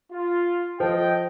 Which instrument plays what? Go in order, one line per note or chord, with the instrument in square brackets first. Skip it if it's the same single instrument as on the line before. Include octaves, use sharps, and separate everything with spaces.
[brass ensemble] F4
[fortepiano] F3 [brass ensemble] A4 D#5 G5